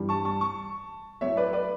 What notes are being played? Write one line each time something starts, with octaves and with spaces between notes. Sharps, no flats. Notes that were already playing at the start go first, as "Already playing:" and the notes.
Already playing: G2 E3 G3
A5 C#6
A5 C#6
A5 C#6
A2 F#3 A3 C#5 E5
B4 D5
B4 D5